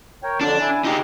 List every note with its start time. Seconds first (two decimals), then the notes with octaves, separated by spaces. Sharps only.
0.23 A#4 C#5 G5
0.41 F2 D3 F#3 D4
0.60 E4 G#5
0.85 C#3 D#4 G4